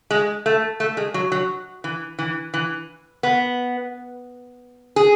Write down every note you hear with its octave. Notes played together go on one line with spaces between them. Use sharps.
G#3
A3
A3
G#3
F#3
F#3
E3
E3
E3
B3
G#4